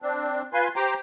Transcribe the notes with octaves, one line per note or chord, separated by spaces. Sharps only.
C4 D4
F4 B4 G#5 C6
G4 C5 G5 A#5 D6